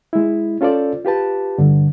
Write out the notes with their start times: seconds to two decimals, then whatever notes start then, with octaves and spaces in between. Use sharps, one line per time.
0.13 G#3 E4
0.61 C#4 F4 A4 C5 D5
1.05 F4 G4 B4 A5
1.58 G2 D3